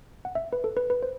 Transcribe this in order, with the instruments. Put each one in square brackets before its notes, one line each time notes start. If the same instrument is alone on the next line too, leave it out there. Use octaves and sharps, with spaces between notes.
[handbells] F#5
E5
B4
A4
B4
B4
C5